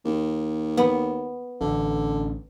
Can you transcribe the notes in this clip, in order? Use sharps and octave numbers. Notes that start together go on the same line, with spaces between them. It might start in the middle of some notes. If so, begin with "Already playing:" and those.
D#2
B3
A1 D3